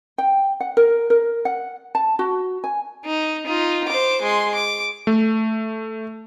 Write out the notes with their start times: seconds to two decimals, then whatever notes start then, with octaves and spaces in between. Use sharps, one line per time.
0.18 G5
0.60 F#5
0.77 A#4
1.10 A#4
1.45 F#5
1.95 A5
2.19 F#4
2.64 G#5
3.05 D#4
3.46 D#4 F4
3.88 C5 D6
4.22 G#3 C6
4.55 D6
5.07 A3